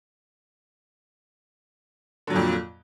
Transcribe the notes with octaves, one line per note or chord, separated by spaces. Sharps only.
F2 A#2 D3 F#3